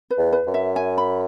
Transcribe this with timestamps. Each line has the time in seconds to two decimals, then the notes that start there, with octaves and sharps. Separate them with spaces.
0.11 B4
0.18 E2
0.33 B4
0.47 F#2
0.54 E5
0.76 G#5
0.98 B5